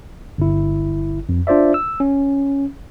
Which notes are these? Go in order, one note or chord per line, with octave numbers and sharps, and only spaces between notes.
G1 E4
F2
D4 F4 C5 D5 E5
E6
C#4